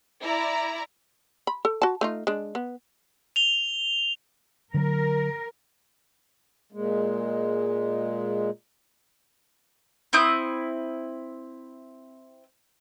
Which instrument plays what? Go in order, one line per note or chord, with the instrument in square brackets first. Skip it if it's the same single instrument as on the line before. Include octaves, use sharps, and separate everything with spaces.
[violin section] E4 D5 A#5
[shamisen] B5
A4
F#4 A5
A3 D#4 F4
G#3 D4
B3
[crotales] F7 G7
[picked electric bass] D3 F#3 [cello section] A#4
[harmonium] A#2 G#3
[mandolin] C4 E4 D#6 G6